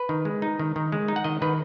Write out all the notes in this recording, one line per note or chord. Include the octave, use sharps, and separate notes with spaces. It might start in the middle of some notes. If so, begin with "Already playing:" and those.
Already playing: B4
D#3
G#3
D#4
D#3
D#3
G#3
D#4
F#5
D#3 D#5
D#3 B4